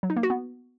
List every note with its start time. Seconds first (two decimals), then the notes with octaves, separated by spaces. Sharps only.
0.03 F#3
0.10 D#4
0.17 A#3
0.23 F#4
0.30 B3